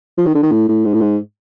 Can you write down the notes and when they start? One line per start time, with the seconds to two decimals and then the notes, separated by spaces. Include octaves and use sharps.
0.18 F3
0.26 D#3
0.35 D3
0.43 D#3
0.52 A2
0.69 A2
0.85 G#2
0.93 A2
1.01 G#2